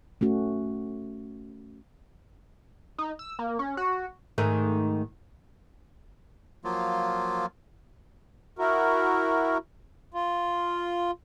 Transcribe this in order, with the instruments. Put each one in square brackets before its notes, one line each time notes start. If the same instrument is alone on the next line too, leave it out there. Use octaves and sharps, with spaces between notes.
[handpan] A3 C#4 F#4
[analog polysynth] D#4
E6
A#3
C#4
F#4
[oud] G#2 D#3 A3
[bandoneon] F3 F#3 A#3 F4
[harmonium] E4 F#4 A#4
F4